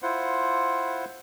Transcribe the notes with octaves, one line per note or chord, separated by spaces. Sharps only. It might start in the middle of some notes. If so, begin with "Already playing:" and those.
E4 F4 C5 F#5